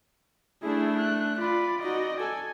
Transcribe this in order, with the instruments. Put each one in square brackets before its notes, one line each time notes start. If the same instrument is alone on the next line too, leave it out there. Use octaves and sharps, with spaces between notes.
[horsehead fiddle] A3 D4 [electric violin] E4 G#4
[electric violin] F#6
[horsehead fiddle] F4 [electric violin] D5 B5
[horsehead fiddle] D#4 F#4 [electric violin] D5 D#5
[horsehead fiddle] A4 [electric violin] G#5